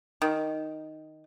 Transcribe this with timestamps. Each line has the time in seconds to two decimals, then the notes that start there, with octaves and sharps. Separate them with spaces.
0.22 D#3